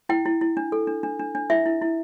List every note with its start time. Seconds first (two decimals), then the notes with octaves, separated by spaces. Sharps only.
0.09 E4 G5
0.25 E4
0.41 E4
0.57 D4
0.72 A4
0.87 D4
1.03 D4
1.19 D4
1.35 D4
1.50 E4 E5
1.66 E4
1.82 E4